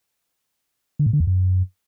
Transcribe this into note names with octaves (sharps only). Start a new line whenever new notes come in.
D3
A2
D3
E2
F#2